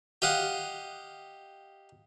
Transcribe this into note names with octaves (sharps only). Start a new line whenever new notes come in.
G4 D#5 F5 F#5